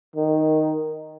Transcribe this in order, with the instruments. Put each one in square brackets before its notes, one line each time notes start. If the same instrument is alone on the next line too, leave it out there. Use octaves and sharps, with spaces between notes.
[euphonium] D#3